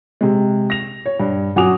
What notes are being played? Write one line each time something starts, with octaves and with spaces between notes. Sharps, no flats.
C3 G#3
A#6 F7
C#5
G2
F#2 F#4 G#5 D6 D#6 F7